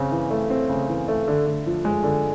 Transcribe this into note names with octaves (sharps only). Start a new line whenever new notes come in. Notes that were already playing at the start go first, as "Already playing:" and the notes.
Already playing: C#3 C4
E3
A3
C4
C#3
E3
A3
D3
D3
F3
G#3
D3